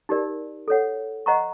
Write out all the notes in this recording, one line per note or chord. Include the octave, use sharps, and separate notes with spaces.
D#4 G4 A#4 D5
A4 C#5 F#5
C5 D#5 F#5 A#5 C#6